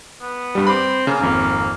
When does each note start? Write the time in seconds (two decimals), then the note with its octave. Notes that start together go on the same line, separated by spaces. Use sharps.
0.21 B3
0.55 G2 G3
0.67 C4 B5 D6
1.07 C#3 A#3
1.21 G#1 F2 A#3